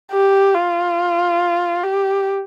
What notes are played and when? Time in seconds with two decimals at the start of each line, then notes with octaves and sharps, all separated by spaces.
0.12 G4
0.55 F4
1.83 G4